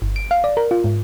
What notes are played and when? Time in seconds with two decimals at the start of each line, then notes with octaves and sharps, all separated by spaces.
0.02 G1
0.16 D7
0.31 F5
0.44 D5
0.57 A#4
0.71 F4
0.84 G#2